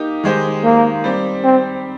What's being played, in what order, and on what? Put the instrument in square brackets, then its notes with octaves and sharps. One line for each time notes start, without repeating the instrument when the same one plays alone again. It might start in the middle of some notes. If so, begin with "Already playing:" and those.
Already playing: [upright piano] A#3 D#4 G4
D#3 G#3 D#4 G4 C5
[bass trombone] A#3
[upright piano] G3 C4 G4
[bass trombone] C4